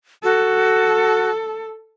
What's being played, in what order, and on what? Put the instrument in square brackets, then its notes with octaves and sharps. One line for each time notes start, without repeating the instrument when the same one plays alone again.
[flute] F#4 [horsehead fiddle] A4